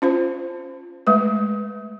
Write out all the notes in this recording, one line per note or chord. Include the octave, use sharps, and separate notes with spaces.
C#4 F4 C5
G#3 A3 B4